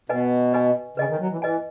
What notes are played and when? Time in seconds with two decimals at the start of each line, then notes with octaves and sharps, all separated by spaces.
0.09 B2 B4 D#5 G#5
0.53 B4 D#5 G#5
0.97 C#3 B4 D#5 G#5
1.09 D#3
1.20 F#3
1.31 E3
1.41 E3 B4 D#5 G#5